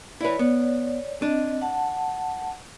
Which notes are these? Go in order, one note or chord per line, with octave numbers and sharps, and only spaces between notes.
E4 B4 C#5 D5
B3
C4 D4 D#5
F#5 A5